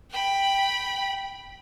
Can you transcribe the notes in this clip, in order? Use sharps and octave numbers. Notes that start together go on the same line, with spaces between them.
G5 B5